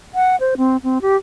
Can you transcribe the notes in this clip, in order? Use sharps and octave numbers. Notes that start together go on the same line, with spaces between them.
F#5
C5
C4
C4
G4